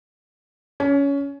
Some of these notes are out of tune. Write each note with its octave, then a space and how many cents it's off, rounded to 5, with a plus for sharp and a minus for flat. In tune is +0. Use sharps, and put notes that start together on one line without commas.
C#4 +20